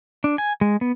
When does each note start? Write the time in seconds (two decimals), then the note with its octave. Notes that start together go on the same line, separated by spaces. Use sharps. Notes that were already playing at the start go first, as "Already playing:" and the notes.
0.24 D4
0.38 G#5
0.61 G#3
0.81 B3